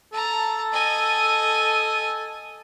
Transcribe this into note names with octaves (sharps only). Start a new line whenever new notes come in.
A4 A5 A#5
D#5 G#5